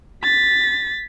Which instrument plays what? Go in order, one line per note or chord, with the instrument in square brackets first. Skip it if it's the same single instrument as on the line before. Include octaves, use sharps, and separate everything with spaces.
[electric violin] A6 B6